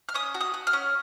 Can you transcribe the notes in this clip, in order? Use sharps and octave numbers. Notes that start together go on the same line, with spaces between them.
F6
C#4 D#6
F#4
D#6
F#4
F6
C#4